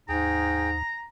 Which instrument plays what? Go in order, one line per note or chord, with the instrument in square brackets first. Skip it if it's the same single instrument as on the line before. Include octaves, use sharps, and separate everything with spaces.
[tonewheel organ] D#2 [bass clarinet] G#2 [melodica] G#4 G5 [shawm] A#5